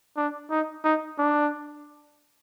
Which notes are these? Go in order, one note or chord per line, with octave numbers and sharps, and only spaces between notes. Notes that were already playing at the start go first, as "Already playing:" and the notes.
D4
D#4
D#4
D4